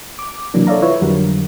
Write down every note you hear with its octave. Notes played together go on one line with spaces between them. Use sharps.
D6
C3 E3 F#3 A#3 D4
A4 C#5 D5 E5 F5 A#5
E4 F4 B4 C#5 E5
F2 D3 F#3 G3 F#4 A#4